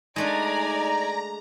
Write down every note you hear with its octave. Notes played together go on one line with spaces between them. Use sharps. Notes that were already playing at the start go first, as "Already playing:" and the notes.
G#3 A3 D4 D#4 D5 G#5 A#5